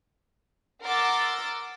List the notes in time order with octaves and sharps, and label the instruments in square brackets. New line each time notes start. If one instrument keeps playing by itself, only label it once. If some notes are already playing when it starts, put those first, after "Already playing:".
[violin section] A#4 F#5 C6 D6 E6 A6